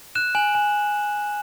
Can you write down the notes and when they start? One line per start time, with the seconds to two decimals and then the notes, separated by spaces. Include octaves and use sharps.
0.15 F#6 E7
0.35 G#5 F#7
0.55 G#5